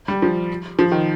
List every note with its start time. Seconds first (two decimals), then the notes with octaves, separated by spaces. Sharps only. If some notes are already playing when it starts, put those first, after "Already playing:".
0.08 G3
0.22 F3
0.79 F3
0.92 D#3